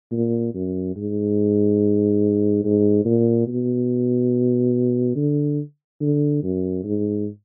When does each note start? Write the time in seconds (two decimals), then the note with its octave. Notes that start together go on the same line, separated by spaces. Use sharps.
0.12 A#2
0.54 F#2
0.96 G#2
2.64 G#2
3.05 A#2
3.48 B2
5.16 D3
6.01 D3
6.43 F#2
6.84 G#2